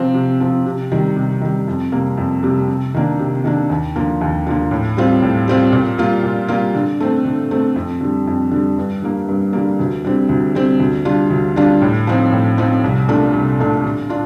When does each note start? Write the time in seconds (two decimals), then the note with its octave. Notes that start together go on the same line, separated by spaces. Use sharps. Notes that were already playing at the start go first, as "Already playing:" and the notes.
Already playing: C3 F3 C4
0.14 C3
0.40 F3 C4
0.66 C3
0.91 D#3 G3
1.17 C3
1.41 D#3 G3
1.67 F2
1.92 C3 G3 A#3
2.17 F2
2.43 C3 G3 A#3
2.69 C3
2.94 D#3 A#3 D4
3.19 C3
3.44 D#3 A#3 D4
3.70 D#2
3.96 D3 F3 A#3
4.21 D#2
4.47 D3 F3 A#3
4.71 A2
4.97 G3 C4 F4
5.22 A2
5.48 G3 C4 F4
5.72 A#2
5.98 G3 A#3 F4
6.23 A#2
6.48 G3 A#3 F4
6.74 D3
7.00 A3 C4
7.25 D3
7.51 A3 C4
7.76 F2
8.01 D3 G3
8.27 F2
8.51 D3 G3
8.78 G2
9.02 D3 G3 A#3
9.28 G2
9.53 D3 G3 A#3
9.79 D2
10.05 D3 G3 C4
10.29 D2
10.55 D3 G3 C4
10.80 D2
11.05 D3 G3 D4 F4
11.30 D2
11.56 D3 G3 D4 F4
11.82 A2
12.07 F3 C4 D#4
12.33 A2
12.58 F3 C4 D#4
12.84 C2
13.08 A#2 A3 D4
13.33 C2
13.60 A#2 A3 D4
13.84 D3
14.09 D4 F4